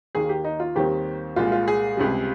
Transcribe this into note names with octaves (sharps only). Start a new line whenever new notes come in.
D#2 D#3 A#3 G#4
G4
D#4
F4
D#2 D#3 G3 C4 G4
C2 A#2 G#3 F4
F4
G#4
C#2 C3 G3